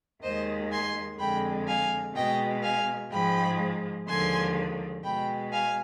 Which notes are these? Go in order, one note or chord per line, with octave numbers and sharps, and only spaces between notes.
D#2 D#3 G#3 C5 D#5
G#5 C6
F2 D3 G#3 G5 B5
F5 G#5
B2 G#3 D#5 G5
F5 G#5
G#2 F3 G#3 G5 B5
D#2 D3 F3 G#3 G#5 C6
B2 G#3 G5 B5
F5 G#5